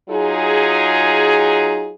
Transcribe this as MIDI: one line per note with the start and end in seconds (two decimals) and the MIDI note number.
0.10 1.94 54
0.10 1.94 63
0.10 1.94 65
0.10 1.94 68